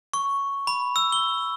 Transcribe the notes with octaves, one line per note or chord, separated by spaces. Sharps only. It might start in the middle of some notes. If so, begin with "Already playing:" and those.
C#6
B5
E6
G7